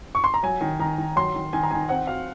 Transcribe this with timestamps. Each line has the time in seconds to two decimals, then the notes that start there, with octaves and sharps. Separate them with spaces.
0.15 C#6
0.24 C6
0.34 A#5
0.43 F#3 G#5
0.61 D#3
0.79 D#3 A#5
0.98 D#3
1.16 F#3 C6
1.35 D#3
1.53 D#3 G#5
1.63 A#5
1.71 D#3 G#5
1.89 C4 F#5
2.07 F#4 F5